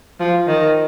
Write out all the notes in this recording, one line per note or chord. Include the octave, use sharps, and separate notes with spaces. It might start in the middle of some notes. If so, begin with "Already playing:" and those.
F3
D#3